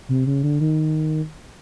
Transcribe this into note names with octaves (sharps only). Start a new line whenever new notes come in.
C3
C#3
D3
D#3